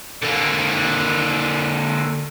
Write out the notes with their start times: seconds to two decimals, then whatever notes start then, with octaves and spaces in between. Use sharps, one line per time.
0.22 D3 A#3